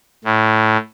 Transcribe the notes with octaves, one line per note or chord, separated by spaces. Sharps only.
A2